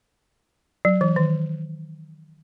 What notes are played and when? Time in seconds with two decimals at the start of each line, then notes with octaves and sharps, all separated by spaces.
0.85 F#3
1.01 E3
1.16 D#3